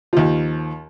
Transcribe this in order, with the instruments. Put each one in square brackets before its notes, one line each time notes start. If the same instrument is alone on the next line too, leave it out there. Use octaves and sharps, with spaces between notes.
[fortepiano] D#2 F3